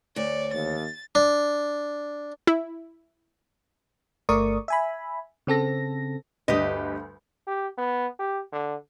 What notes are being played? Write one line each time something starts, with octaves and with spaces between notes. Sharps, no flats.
D2 C#5 D5
D#2 A6
D4
E4
G1 A3 A#4 D5 C#6 D#6
E5 G#5 B5
C#3 C4 A4 A#6
D2 G2 G4 B4 D#5
G4
B3
G4
D3